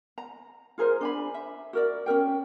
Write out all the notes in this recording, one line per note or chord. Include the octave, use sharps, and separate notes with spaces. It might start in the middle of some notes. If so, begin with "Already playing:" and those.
A#5
F4 G#4 A#4 C5
D4 G#5 B5
E5
F#4 A#4 D5
C#4 A4 A#4 G5